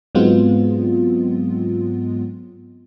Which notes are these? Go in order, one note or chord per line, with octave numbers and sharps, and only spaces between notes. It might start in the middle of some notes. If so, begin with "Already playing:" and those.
G#2 F#3 G#3 B3 C4 F4